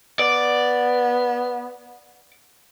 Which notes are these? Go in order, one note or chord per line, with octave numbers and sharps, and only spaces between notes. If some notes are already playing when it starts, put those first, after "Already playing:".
B3 D5